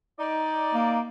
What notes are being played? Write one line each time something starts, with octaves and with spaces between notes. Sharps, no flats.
D#4 D5
A#3